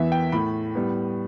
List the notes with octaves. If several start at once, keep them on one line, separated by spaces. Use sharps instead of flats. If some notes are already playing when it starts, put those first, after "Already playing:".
Already playing: E2 E3 B3 E5
G5
A2 A3 B5
A2 G3 B3